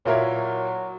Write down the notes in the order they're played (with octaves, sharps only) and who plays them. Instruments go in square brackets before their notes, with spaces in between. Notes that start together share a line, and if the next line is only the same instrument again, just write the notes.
[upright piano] A#2 A#3 E4 A#4 C#5 [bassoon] F#3